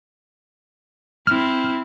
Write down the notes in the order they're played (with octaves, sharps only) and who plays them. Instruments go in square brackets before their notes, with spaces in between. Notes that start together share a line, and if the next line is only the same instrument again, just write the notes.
[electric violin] C4 E4 [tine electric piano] F6